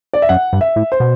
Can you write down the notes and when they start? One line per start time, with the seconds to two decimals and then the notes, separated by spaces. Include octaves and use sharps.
0.13 D5
0.22 E5
0.29 F#2 F#5
0.53 G2
0.61 E5
0.76 A2
0.92 C5
1.00 B2